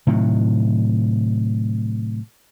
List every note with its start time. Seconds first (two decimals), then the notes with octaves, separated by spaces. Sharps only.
0.07 A2 C3 D#3 F#3